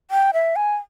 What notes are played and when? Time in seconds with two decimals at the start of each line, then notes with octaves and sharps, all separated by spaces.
0.11 G5
0.34 E5
0.56 G#5